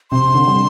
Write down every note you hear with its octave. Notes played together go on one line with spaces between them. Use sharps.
C3 C6
D3
G3